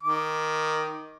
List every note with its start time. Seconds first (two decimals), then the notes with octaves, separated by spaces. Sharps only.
0.03 D#3 D6